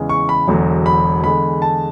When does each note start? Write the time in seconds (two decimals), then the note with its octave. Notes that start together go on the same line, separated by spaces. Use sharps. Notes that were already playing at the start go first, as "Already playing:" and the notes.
Already playing: E2 C#3 E3 G#3
0.09 C#6
0.29 B5
0.48 E1 E2 D3 F#3
0.86 B5
1.24 E2 D3 G#3 B5
1.62 A5